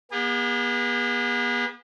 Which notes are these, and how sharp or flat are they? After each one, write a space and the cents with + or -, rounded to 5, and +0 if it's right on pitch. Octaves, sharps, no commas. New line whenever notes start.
B3 -40 G#4 -35